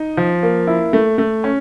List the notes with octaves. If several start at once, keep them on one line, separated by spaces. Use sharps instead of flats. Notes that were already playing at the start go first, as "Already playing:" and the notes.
Already playing: D#4
F3
A#3
E4
A3
A3
C#4